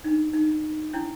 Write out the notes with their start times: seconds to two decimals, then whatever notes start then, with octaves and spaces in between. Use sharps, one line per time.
0.04 D4 D#4
0.34 D#4
0.93 C#4 D4 E4 G#5